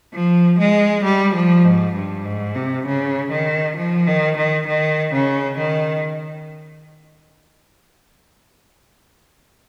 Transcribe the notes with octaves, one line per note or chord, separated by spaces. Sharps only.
F3
G#3
G3
F3
G#2
G2
G#2
C3
C#3
D#3
F3
D#3
D#3
D#3
C#3
D#3